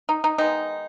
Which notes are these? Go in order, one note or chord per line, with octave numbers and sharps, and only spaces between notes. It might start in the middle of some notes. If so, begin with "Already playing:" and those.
D#4
D#4
D#3 G#3 B3 D#4